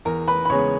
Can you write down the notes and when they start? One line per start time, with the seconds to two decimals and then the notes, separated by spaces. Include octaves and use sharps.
0.05 E2 A#4 A#5
0.28 B4 B5
0.45 B5
0.50 C#3 G#3 B3 C#5 C#6